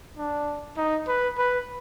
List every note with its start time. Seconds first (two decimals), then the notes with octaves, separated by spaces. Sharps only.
0.17 D4
0.77 D#4
1.08 B4
1.38 B4